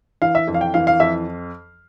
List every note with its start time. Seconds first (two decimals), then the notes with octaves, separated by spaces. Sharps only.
0.22 E3 F5
0.35 E5
0.48 F2
0.54 F5
0.61 G5
0.74 E3 F5
0.87 F5
1.00 F2 E5